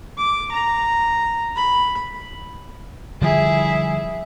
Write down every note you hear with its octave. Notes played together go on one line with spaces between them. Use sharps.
D6
A#5
B5
D3 F3 G3 E4 G#4